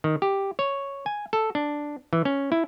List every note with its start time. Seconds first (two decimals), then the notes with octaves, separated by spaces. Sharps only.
0.04 D#3
0.22 G4
0.59 C#5
1.06 G#5
1.33 A4
1.55 D4
2.13 E3
2.25 C#4
2.52 E4